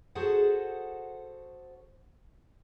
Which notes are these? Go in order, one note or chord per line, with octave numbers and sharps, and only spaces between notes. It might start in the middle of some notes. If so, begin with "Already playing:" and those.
F#4 G#4 A4 C5 F#5